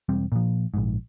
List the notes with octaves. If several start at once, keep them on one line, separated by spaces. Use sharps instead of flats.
E1 G3 C4
A#2 F3
A#1 G#2